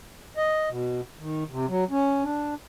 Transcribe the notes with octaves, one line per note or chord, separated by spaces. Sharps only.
D#5
B2
D#3
C3
F#3
C#4
D4